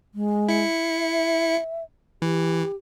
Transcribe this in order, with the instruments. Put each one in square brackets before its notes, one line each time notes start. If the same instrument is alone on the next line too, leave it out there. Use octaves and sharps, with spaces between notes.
[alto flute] G#3
[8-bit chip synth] E4 C#7
[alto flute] E5
[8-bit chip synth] E3 [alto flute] G4